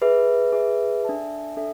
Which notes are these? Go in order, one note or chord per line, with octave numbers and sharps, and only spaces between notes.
G#4 B4 E5
G#4 B4 E5
D4 A4 E5 A5
D4 A4 E5